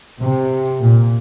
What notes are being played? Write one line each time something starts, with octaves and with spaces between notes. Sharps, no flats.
C3
A#2